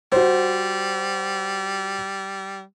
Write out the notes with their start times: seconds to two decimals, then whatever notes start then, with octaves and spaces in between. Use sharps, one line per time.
0.12 G3 F#4 C5